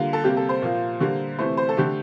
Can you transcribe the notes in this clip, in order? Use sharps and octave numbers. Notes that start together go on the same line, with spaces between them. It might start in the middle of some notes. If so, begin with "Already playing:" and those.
Already playing: D3 G3 A#3 F4
A4
C3 G3 A#3 G4
A4
C5
A#2 F3 A#3
D3 G3 A#3
C3 E3 A3 C5
C5
A4
D3 A3 G4